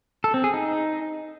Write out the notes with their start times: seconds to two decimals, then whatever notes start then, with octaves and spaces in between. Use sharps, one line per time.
0.24 A4
0.34 C4
0.44 G#4
0.54 D#4